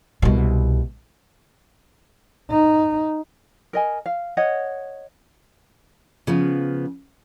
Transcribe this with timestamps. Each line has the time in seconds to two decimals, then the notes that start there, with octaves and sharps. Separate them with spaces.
0.22 C2 B2
2.51 D#4
3.73 A#4 D#5 G#5
4.06 F5
4.37 C#5 D#5 F#5
6.27 C#3 F3 B3